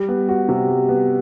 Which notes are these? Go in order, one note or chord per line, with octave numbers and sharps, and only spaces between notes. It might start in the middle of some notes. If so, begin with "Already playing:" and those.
Already playing: G3
B3
F#4
C3
G3
B3